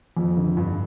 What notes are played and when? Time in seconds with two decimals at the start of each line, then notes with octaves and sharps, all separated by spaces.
0.17 F2
0.37 D3
0.57 G2